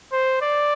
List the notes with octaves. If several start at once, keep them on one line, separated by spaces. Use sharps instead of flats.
C5
D5